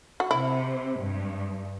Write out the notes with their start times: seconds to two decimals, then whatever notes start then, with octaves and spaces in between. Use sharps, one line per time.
0.20 F#4
0.30 C3 E4
1.00 G2